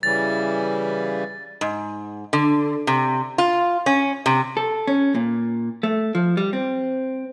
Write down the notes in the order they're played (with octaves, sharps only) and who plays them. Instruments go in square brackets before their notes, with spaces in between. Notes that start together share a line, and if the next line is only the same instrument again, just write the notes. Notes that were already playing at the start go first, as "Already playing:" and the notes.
[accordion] C#3 E3 G3 [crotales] A6
[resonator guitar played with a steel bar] G#2
D3
C3
F4
C#4
C3
[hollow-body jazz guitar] A4
C#4
A#2
A3
F3
G3
C4